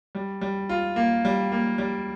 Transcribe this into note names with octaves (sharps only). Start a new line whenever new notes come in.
G3
G3
F4
A#3
G3
A#3
G3